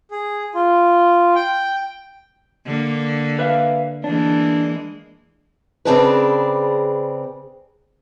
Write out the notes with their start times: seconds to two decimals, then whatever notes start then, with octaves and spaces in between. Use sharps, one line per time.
0.11 G#4
0.55 F4
1.35 G5
2.66 D3 A#3
3.39 B4 E5 F5
4.04 E3 G#3 A#3 D4
5.85 C#3 C4 D4 G#4 A#4 B4